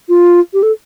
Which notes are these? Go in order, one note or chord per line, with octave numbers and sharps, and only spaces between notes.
F4
G4
A4